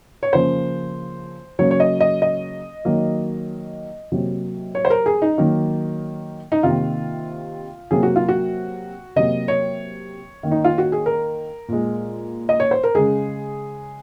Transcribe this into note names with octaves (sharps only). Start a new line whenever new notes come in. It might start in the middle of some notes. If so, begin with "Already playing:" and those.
C#5
C#3 F3 A#3 C5
C#3 F#3 A#3 C#5
C#5
D#5
D#5
D#5
D#3 F#3 A#3
C3 F#3 A#3
C#5
C5
A#4
G#4
D#4
D#3 F#3 A#3
D#4
C3 D#3 A#3 F4
C3 F#3 A#3 G#4
F#4
F4
F#4
C3 F#3 A#3 D#5
C#5
D#3 A#3
D#4
F4
F#4
G#4
A#4
A#2 G#3
D#5
C#5
C5
A#4
C#3 G#3 G#4